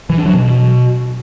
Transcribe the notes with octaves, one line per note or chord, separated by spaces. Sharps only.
E3
D4
F#3
B2